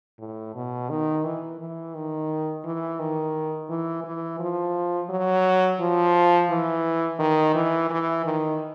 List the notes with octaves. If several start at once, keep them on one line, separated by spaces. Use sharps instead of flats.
A2
B2
D#3
E3
E3
D#3
E3
D#3
E3
E3
F3
F#3
F3
E3
D#3
E3
E3
D#3